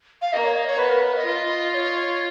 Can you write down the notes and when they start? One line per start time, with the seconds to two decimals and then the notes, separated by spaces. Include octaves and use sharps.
0.22 F5
0.33 A#3 D#5
0.44 C#5
0.56 D#5
0.67 C#5
0.78 B3 B4
0.90 A#4
1.01 B4
1.14 F5
1.17 D#5
1.25 F4
1.70 D#5
1.74 C#5